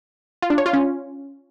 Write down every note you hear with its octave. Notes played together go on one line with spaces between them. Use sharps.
F4
D4
C#5
F4
C#4